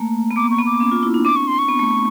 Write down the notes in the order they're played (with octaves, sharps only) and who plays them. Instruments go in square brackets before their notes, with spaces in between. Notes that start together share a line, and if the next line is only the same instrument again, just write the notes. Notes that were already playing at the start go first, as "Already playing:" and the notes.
Already playing: [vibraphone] A3 A#3
B3
[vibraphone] A#3 [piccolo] D6
[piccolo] C#6
[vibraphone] B3
[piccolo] D6
[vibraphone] C#4
F4
E4
D4
[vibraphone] C4 [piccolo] D6
[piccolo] C#6
C6
C#6
[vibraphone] B3
A3